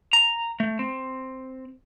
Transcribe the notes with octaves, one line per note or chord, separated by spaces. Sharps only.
A#5
A3
C4